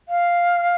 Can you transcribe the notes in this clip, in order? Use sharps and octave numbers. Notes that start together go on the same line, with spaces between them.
F5